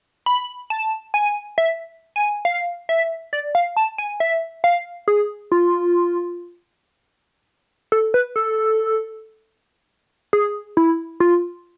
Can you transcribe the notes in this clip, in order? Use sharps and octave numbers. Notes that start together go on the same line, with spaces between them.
B5
A5
G#5
E5
G#5
F5
E5
D5
F5
A5
G#5
E5
F5
G#4
F4
A4
B4
A4
G#4
E4
F4